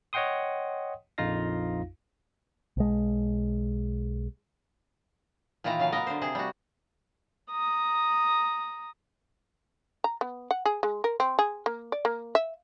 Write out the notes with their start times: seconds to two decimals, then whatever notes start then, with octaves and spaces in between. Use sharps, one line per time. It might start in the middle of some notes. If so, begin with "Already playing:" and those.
0.13 C#5 D#5 F#5 G5 C6 D#6
1.18 A#1 F2 D#4 F4 F5 A#6
2.77 B1 G#3
5.64 A#2 D#3 E3 F4 A#5
5.79 C#3 F#3 F5
5.93 B3 A#4 D#5
6.07 D3 C5
6.21 C3 G#4 C5
6.35 G3 F#4
7.51 A#5 D#6
10.04 A#5
10.21 B3
10.51 F#5
10.65 G#4
10.83 G#3
11.04 A#4
11.20 C4
11.39 G#4
11.66 A#3
11.92 D5
12.05 A#3
12.35 E5